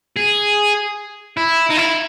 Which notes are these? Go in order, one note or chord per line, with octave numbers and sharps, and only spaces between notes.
G#4
E4
D#4
E4